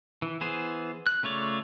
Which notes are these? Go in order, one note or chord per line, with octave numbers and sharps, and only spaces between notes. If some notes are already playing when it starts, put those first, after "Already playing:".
E3
E3 B3 G#4 C5
F#6
C#3 A3 F4 C#5 D5